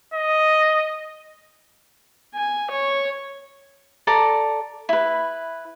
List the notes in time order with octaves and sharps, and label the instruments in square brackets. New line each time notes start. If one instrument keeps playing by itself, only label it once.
[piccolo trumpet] D#5
[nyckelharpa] G#5
C#5
[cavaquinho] A4 D5 A#5
E4 B4